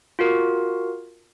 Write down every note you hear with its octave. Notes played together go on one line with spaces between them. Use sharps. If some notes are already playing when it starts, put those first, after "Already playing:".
F4 F#4 A#4